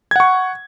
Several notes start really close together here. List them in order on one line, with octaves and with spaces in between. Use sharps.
G#6 F#5 C#6